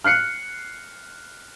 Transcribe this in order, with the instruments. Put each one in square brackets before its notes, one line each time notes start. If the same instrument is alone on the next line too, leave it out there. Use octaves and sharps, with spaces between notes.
[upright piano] F6 F#6 C7 C#7